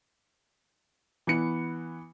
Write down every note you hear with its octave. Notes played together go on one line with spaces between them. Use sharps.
E3 B3 C#7